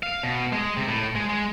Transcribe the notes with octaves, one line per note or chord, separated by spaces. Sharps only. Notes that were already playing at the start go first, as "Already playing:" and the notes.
F5
B2
G#3
C3
A2
G#3
G#3